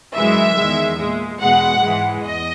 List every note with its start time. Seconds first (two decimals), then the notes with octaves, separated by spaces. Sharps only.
0.15 F#2 E3 G#3 E5
0.57 E2 D#3 G#3
0.99 A#2 G#3
1.41 E2 B2 G#3 F#5
1.82 G#2 E3 G#3
2.24 E2 D#5